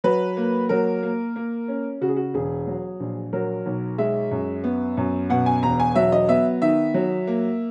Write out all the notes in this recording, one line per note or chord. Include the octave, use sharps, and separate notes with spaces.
F#3 B4
A#3
F#3 A#4
A#3
A#3
C#4
C#3 F#4
G#4
F#4
E1 G#4
F#3
A#1
F#3 A#4
B1
G#3 E5
F#2
B3
F#2
B2 F#5
G#5
E1 A#5
G#5
F#3 E5
D#5
B3 E5
D#3 E5
F#3
A#3